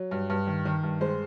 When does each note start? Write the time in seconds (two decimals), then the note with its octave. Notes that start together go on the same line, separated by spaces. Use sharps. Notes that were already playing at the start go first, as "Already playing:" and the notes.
Already playing: F#3
0.11 G2
0.30 G2
0.47 D#3
0.65 D#3
0.83 G2
1.01 G#3 C5